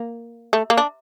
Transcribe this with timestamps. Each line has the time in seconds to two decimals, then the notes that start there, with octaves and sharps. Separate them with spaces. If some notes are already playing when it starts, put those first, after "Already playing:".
Already playing: A#3
0.53 A3
0.70 A#3
0.77 D4